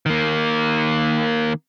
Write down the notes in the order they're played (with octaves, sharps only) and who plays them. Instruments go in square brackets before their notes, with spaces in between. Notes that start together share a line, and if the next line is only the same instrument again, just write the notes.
[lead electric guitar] D#3 A#3